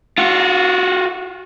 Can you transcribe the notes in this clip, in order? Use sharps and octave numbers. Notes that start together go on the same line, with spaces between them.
F4 F#4